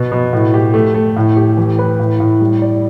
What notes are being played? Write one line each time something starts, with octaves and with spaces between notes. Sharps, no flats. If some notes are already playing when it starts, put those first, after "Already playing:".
Already playing: B2
B2
A2
G4
A3
A3
A2
G4
E3
B4
A2
A2
G3
D5